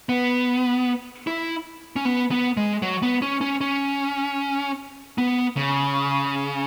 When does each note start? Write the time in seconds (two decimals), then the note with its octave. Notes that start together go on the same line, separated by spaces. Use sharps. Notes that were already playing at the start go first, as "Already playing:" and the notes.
0.09 B3
1.27 E4
1.96 C#4
2.05 B3
2.31 B3
2.57 G#3
2.82 F#3
3.02 B3
3.22 C#4
3.41 C#4
3.61 C#4
5.18 B3
5.57 C#3